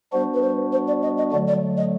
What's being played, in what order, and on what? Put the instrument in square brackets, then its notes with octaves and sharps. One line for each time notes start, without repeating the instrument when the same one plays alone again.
[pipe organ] G3 B3 D4 F#4 [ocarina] C5
[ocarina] B4
C5
C5
D5
D#5
D#5
[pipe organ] D3 F#3 A3 [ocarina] D5
[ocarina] D5
D#5